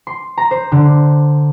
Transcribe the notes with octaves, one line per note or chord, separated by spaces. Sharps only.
C6
A#5
C5
D3